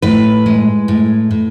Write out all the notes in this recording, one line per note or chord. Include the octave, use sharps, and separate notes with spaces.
A2 B4
G#3
A2
A2